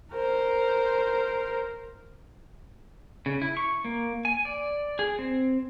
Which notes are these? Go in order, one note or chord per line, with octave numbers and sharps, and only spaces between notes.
A#4 C5
C#3
E4
C#6
A#3
G#5
D5
G#4
C4